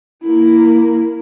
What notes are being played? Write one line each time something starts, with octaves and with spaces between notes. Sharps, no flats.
A#3 E4